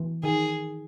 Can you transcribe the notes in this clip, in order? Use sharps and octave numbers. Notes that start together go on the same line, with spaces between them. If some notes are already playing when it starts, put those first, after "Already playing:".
Already playing: E3
D#3 G#4